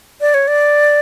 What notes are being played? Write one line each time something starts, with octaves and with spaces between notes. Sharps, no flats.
D5
C#5
D5